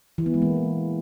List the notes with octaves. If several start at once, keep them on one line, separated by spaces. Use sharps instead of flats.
E3
B3
G#3
A#3